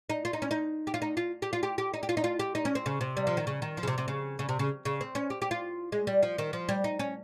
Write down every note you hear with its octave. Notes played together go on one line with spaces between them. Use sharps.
D#4
F4
D#4
C#4
D#4
G4
F4
D#4
F4
G4
F4
G4
G4
D#4
G4
F4
D#4
F4
G4
D#4
C#4
C4
C#3
C3
G3
F3
D#3
C#3
D#3
F3
C#3
C3
C3
C#3
C#3
C3
C#3
C#3
C4
C#4
G4
G4
F4
G#3
G3
F3
D#3
F3
G3
D#4
C#4